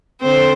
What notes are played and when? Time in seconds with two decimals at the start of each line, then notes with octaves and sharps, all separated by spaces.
0.20 D3 C4 C5